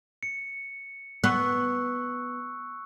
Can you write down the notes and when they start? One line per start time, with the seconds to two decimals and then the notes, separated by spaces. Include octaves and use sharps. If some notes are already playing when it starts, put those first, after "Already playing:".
0.23 C#7
1.24 B3 C#6 E6 F#6